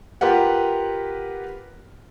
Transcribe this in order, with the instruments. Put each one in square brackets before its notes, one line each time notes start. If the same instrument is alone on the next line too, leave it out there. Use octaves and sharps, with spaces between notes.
[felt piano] F4 G4 A#4 B4 F#5